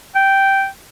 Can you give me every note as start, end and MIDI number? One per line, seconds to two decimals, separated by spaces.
0.15 0.66 79